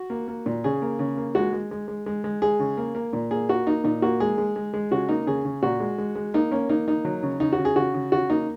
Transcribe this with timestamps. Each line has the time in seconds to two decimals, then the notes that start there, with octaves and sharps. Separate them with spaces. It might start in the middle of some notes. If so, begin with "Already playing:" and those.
Already playing: F#4
0.10 A#3
0.28 A#3
0.46 A#2
0.64 C#3 G#4
0.82 A#3
0.99 C#3
1.17 A#3
1.35 G#3 F#4
1.53 G#3
1.71 G#3
1.88 G#3
2.06 G#3
2.24 G#3
2.42 G#3 G#4
2.60 C#3
2.77 A#3
2.95 A#3
3.13 A#2
3.31 A#3 G#4
3.49 A#3 F#4
3.67 A#3 D#4
3.84 A#2 D#4
4.02 A#3 F#4
4.20 G#3 G#4
4.38 G#3
4.56 G#3
4.74 G#3
4.91 C#3 F#4
5.09 A#3 D#4
5.27 C#3 G#4
5.45 C#3
5.63 A#2 F#4
5.80 G#3
5.98 G#3
6.15 G#3
6.34 A#3 D#4
6.51 A#3 C#4
6.69 A#3 D#4
6.88 A#3 D#4
7.05 F#3
7.23 C#3
7.40 C#3 D#4
7.52 F#4
7.59 C#3
7.65 G#4
7.76 C#3 F#4
7.94 C#3
8.12 C#3 F#4
8.30 A#3 D#4